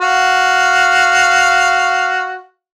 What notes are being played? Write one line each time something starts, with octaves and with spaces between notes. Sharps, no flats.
F#4 F5